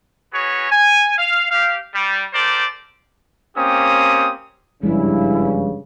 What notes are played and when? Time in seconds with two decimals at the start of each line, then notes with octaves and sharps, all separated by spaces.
0.33 C#4 F#4 G#4 B4 C#5
0.71 G#5
1.17 F5
1.50 G4 F5
1.93 G3
2.33 G4 A4 A#4 C5 D5
3.56 A#3 C4 C#4 G4 D#6
4.83 F#1 G2 C#3 F3 G#3 E4